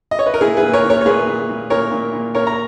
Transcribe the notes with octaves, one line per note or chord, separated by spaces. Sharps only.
D#5
C#5
B4
A#4
A#2 E4 G#4
G#4 B4
A#2
A#4 C#5
A#2
A#4 C#5
C#5
A#2 G#4 B4
A#2
A#2
A#2 A#4 C#5
A#2
A#2
A#2 A#4 C#5
A#5